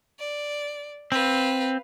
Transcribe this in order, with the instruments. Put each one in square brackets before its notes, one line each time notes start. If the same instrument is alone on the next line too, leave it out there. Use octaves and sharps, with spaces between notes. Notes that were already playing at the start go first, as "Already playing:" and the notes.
[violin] D5
[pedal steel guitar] C4 [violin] B4 F5